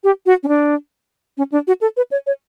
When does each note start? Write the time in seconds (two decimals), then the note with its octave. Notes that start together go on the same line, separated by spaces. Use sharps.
0.04 G4
0.26 F#4
0.43 C#4
0.48 D4
1.37 C#4
1.52 D4
1.67 F#4
1.81 A4
1.97 B4
2.11 C#5
2.27 C#5